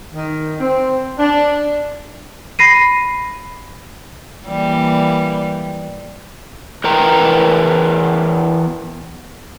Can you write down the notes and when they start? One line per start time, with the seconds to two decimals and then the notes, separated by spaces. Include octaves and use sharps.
0.14 D#3
0.59 C4
1.18 D4
2.59 B5 A#6 C7 D#7
4.47 E3 G3 A#3
6.84 E2 A#4 B4 G5 A#5